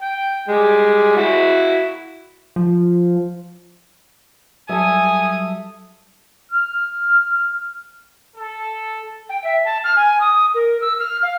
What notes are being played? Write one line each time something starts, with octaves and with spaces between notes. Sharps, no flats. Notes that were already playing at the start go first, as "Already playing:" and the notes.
G5
G3 G#3
E4 F#4
F3
F#3 G3 A4 E5 G#5 D#6
F6
A4
G5
E5
A5
F6
G#5
D#6
A#4
E6
F6
F5